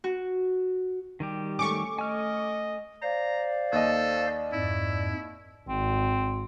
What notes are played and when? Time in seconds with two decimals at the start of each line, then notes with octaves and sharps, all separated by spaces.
0.04 F#4
1.20 D#3 G3 G4
1.59 A3 C#4 C#6 D6
1.99 D#5 G#5 F6
3.02 C5 D5 F5 A#5
3.72 D#2 A4 D#5
4.53 F2 G#2 E4
5.69 G#1 C4